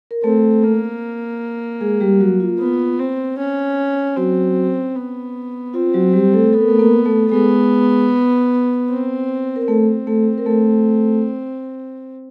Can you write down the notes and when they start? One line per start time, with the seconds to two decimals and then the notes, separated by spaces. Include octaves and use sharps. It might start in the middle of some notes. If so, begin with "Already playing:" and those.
0.11 A#4
0.23 A3 C4 A4
0.63 A#3
1.81 G#3 G#4
2.00 G3 G4
2.20 F#3 F#4
2.40 F4
2.59 B3
2.99 C4
3.38 C#4
4.16 F#3 C4 F#4
4.96 B3
5.74 C4 F4
5.94 F#3 F#4
6.13 G3 G4
6.33 A3 A4
6.53 B3 A4
6.61 A#4
6.68 A3 A4
6.79 A#3 A#4
7.05 A3 A4
7.26 A4
7.31 G#3 B3 G#4
8.89 C4
9.56 A#4
9.67 A3 C4 A4
10.07 A3 A4
10.38 A#4
10.46 A3 A4